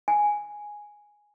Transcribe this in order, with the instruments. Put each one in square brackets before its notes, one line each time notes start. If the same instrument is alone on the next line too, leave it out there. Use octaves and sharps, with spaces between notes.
[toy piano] G#5